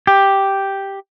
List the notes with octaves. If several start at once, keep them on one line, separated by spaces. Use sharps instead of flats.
G4